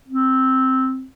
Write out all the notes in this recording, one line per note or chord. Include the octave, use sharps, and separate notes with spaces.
C4